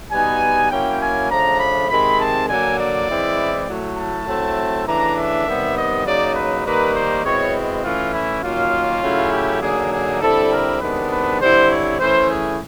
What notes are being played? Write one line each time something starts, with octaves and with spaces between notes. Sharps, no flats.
B2 G3 B3 D#4 G#5
F#3 A#3 C#4 E4 G5
G#5
C#3 F3 A3 D4 A#5
B5
C3 D#3 G#3 C4 B5
A5
D3 F#3 A#3 G#5
D5
E3 G#3 C4 E4
A2 F#3 A3
A5
F#3 A3 C4 E4
C#3 E3 A3 D4 A#5
E5
C3 D#3 G3 B3
D#5
C#3 F#3 A#3 D#4 D5
B4
D#3 G3 A#3 D#4 B4
C5
B2 G#3 C4 E4 C#5
E3 A3 C#4 F4
E4
D#3 F#3 A#3 C#4 F4
C#3 F#3 A3 C#4 E4
G4
D3 F#3 A#3 D#4 G#4
G#4
D3 G3 C4 E4 A4
A#4
C3 D#3 G#3 B3 D4 B4
B4
D3 G3 C4 E4 C5
C#5
E3 A3 C#4 E4 C5
G#4